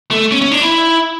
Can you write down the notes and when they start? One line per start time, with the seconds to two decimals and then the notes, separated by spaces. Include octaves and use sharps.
0.11 A3
0.31 C#4
0.41 C#4
0.51 D4
0.61 E4